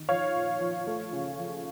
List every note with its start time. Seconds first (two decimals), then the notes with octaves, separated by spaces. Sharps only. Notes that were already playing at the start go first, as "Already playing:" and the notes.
Already playing: D#3
0.09 F3 C#5 F5
0.35 A#2
0.61 F3
0.87 A3
1.13 C#3
1.39 F3